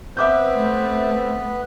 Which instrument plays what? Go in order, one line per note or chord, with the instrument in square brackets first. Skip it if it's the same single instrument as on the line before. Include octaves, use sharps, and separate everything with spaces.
[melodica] B3 B4 [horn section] C4 [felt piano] E5 D6 G6
[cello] A3